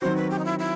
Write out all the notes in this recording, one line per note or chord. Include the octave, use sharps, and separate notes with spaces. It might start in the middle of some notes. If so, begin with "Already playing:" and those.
D#3 F#3 C4 F#4 C5
B4
G4
D#4
E4
E4